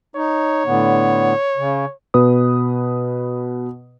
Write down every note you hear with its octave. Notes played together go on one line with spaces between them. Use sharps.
D#4 C#5
A2 D3 B3
C#3
B2 B4 D#6